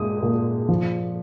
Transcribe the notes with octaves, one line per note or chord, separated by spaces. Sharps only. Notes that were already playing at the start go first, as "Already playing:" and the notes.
Already playing: A#2 G#3 D#6
A#2
F3